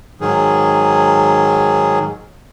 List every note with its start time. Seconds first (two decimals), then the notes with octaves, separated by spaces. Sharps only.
0.21 G#2 D#3 F#3 G#4